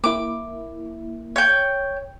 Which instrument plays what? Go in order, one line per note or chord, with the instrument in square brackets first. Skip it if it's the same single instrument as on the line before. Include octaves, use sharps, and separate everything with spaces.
[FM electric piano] A#3 E4 [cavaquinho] D6
[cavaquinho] C#5 G5